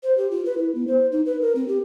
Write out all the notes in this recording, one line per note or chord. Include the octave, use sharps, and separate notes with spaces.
C5
G4
F4
B4
E4
B3
C5
D#4
B4
A#4
C4
G4